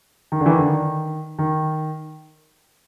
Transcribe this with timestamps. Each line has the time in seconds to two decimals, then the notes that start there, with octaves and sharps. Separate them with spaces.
0.32 D#3
0.41 D3
0.46 E3
0.50 D#3
0.58 D3
0.67 D#3
1.39 D#3